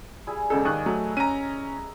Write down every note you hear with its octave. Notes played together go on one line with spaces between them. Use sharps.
G3 E4 G#4
E1 C#3 D#4 E4 A4
D#2 C#6 D#6 F#6
F#3 A3
C#4 A#5 D#7